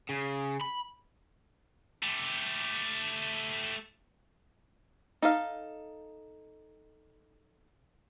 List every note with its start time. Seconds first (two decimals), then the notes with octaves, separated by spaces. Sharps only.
0.09 C#3
0.61 B5
2.03 A3 G4
5.22 D#4 A4 F5